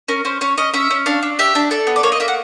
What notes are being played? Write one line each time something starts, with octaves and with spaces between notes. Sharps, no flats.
C#4 A#4
C#4 C5
C#4 C#5
C#4 D#5
C#4 E5
C#4
D4 F5
D4
G4 E5
D4
A4 D5
B3
D5
A#3 C#5
D#5
A#3 E5
F#5